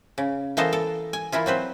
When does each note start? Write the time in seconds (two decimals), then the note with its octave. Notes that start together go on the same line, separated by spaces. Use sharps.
0.18 C#3
0.57 E3 A#3 B3 A4 C5 D#5
0.73 A4
1.13 G#5
1.32 E3 A#3 E4 F4
1.46 F#3 C4 B4 C5